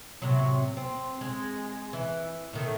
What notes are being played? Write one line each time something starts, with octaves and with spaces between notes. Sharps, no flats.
A2 C3 F#3
C4
G#3
E3
A2 D#3 A3